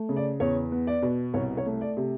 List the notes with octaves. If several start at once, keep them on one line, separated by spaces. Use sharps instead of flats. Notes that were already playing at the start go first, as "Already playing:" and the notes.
Already playing: A3
C#3
D5
E2 C#5
B3
D5
B2
C2 C#5
C#5
A3
D5
C3